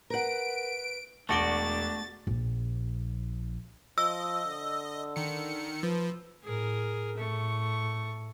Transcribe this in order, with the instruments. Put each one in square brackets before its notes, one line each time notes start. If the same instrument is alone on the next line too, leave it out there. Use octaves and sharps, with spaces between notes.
[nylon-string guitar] A#4 F#5 [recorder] B4 [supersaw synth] D7
[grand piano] E1 D6 G7 [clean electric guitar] A3 F#4 D5 [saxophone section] D4 [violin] A6
[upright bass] A#1
[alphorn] F3 [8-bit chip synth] D#5 [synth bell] E6
[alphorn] D3
[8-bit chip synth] D#3 C#7
[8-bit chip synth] F3 [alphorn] B4
[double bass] A2 [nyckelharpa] G#4 A#4
[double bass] A2 [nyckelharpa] A3 C#6